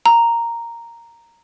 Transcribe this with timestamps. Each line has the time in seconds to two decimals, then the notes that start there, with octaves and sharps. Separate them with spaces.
0.06 A#5